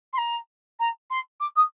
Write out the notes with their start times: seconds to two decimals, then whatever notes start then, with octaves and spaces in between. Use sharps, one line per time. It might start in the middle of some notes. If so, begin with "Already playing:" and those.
0.13 C6
0.18 A#5
0.79 A#5
1.10 C6
1.40 D6
1.56 D#6